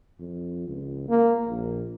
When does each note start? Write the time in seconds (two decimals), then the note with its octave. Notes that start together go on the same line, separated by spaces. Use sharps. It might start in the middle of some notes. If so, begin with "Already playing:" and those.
0.19 F2
0.67 C#2
1.09 A#3
1.48 A#1